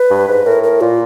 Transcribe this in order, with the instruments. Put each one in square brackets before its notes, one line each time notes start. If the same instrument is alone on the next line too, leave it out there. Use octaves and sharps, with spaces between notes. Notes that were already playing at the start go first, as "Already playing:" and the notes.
Already playing: [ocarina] B4
[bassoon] G2
G#2
[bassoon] A2 [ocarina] A#4
[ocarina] A#4
[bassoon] A#2 [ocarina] F4